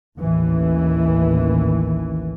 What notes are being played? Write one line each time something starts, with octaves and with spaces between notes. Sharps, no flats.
A1 D#2 E3